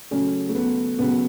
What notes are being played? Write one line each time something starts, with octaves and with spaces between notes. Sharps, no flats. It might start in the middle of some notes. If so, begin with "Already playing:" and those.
C#3 F#3 A3 C#4
A3
B3
C#3 F#3 B3